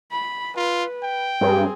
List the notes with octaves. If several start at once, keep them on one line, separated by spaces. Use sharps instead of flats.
B5
F4 B4
G5
G2 C4 G#4